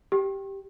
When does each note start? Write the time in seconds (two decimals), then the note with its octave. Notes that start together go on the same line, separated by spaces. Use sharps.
0.12 G4